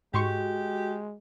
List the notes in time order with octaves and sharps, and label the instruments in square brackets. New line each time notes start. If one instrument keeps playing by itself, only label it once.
[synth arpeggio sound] G#2 C6 C#6 [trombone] G#3 [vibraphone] F#4 [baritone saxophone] G4